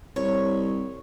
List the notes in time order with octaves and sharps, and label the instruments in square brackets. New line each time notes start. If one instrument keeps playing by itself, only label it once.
[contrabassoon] C2 [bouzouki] C#5